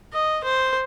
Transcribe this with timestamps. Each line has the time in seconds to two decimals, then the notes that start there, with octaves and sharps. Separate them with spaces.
0.13 D#5
0.44 C5